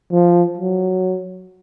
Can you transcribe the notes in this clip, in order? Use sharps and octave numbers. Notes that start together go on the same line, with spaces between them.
F3
F#3